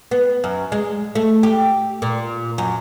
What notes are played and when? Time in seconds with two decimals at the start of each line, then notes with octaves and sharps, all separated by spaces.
0.11 B3
0.44 F#2
0.72 G#3
1.15 A3
1.43 G4
2.02 A#2
2.58 F#2